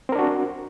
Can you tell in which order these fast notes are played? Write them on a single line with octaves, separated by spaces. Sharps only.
C4 A#4 D4 F#4